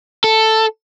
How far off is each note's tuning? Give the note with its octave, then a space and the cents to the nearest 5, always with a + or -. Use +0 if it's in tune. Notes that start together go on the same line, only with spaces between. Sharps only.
A4 +5